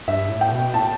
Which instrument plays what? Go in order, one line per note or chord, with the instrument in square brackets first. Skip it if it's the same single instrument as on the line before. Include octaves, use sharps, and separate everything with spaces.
[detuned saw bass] G2 [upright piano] E5
[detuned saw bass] A2
[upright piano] G5
[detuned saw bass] B2
[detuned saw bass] A2 [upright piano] A5